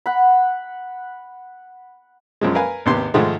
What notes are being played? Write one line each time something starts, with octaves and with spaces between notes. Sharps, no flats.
F#5 B5
F#2 F3 G#3
A#4 B4 F5 G#5
G#1 D#2 C3 B3 G4 C6
G#2 D#3 F3 G#3 A3